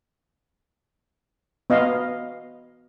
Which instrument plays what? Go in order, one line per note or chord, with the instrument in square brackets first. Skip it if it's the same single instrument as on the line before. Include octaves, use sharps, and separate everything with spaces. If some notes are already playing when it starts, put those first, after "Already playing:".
[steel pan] B3 D#5 F5